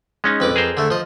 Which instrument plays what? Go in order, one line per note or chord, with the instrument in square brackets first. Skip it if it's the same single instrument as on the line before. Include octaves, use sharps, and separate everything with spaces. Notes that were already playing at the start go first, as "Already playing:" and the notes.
[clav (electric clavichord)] G#3 C#4 D#4
[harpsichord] F2 B4 D6
[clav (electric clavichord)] G#4 A#4 C5
[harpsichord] D3 A3
F3 D#5